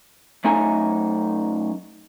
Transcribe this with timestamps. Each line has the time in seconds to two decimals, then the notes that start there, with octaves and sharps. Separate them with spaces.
0.44 F#2 A3 D#4 G#5